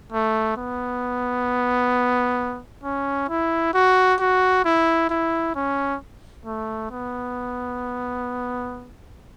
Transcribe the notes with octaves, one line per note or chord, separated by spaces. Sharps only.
A3
B3
C#4
E4
F#4
F#4
E4
E4
C#4
A3
B3